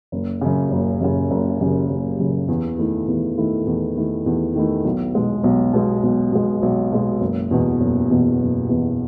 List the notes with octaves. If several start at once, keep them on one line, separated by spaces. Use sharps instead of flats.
F#1
F#2 C#3
F#1
F#2 C#3
F#1
F#2 C#3
F#1
F#2 C#3
E2
D#3 A3 E4
E2
D#3 A3 E4
E2
D#3 A3 E4
E2
D#3 A3 E4
B1
B2 G#3
B1
B2 G#3
B1
B2 G#3
B1
B2 G#3
F#1
E2 B2
F#1
E2 B2
F#1
E2 B2